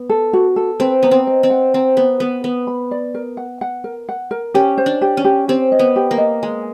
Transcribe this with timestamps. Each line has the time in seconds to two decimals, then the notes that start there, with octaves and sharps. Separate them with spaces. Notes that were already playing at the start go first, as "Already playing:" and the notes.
Already playing: B3
0.10 A4
0.33 F#4
0.56 A4
0.80 C4 B4
1.03 B3 A#5
1.11 C4
1.27 D#5
1.43 C4
1.50 F#5
1.74 C4 A#5
1.97 B3 B4
2.20 B3 B4
2.44 B3 B4
2.67 B5
2.91 D5
3.14 A#4
3.37 F#5
3.61 F#5
3.84 A#4
4.09 F#5
4.31 A#4
4.54 C#4 G4
4.78 C5
4.86 D4
5.02 G4
5.17 C#4
5.25 G4
5.48 C4 G4
5.72 D#5
5.79 B3
5.96 G4
6.11 A#3
6.18 D#5
6.43 G#3 G#5